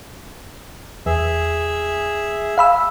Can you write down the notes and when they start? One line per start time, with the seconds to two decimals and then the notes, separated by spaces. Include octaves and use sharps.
1.06 E2 G#4 E5
2.58 F5 B5 E6